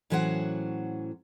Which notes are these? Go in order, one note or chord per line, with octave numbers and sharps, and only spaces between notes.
A2 E3 F#3 C#4 C5 F#5